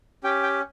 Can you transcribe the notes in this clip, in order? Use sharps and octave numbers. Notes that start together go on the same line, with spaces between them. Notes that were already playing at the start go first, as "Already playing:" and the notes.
C#4 G4 G5
G5